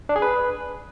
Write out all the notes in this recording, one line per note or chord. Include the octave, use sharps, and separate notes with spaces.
D4
G#4
B4